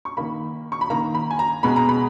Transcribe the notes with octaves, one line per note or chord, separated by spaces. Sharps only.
C#6
D#3 A#3 B5
C#6
B5
D#3 A#3 A#5
B5
G#5
A#5
B2 G#3 B3 B5
A#5
B5